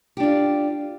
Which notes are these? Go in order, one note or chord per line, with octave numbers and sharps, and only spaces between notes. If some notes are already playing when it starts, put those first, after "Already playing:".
D4 F4 G4